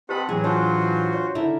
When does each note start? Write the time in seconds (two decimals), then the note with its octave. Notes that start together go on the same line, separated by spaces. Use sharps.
0.09 C4 G4 B4 D#5 F#5 G5 A5 B5
0.29 A2 E3 F#3 G#4
0.44 D4 F4 F#4 C5 C#5 A5
1.14 C#5
1.35 D3 E4 A#4